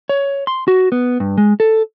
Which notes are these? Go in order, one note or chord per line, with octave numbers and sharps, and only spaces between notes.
C#5
C6
F#4
B3
G2
G#3
A4